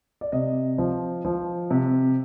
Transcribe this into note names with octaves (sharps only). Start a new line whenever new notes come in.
D5
C3 D#5
F3
F3
C3